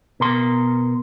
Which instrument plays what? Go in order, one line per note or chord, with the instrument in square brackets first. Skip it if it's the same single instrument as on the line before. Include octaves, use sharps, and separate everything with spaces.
[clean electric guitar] B2 A#4 C6